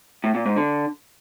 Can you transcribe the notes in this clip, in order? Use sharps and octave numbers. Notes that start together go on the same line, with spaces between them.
A2
A#2
G#2
D3